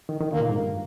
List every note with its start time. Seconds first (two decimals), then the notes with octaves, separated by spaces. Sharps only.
0.09 D#3
0.20 D#3
0.32 D3 A#3
0.40 A#2
0.49 G#2
0.58 G2